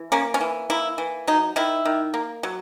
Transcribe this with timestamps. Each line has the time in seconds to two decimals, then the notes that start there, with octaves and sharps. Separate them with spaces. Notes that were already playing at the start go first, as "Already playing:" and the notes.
Already playing: E3
0.12 A#3 C#4
0.34 C#4
0.41 E3
0.70 A#3 E4
0.98 E3
1.27 F#3 D#4
1.56 D#3 E4
1.85 D#3
2.14 A#3
2.43 F#3